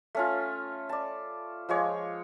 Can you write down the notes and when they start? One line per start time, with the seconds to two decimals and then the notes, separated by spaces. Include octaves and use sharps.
0.15 A3 C#4 F4
0.89 D5 A5
1.69 F3 G#3 C#5 D6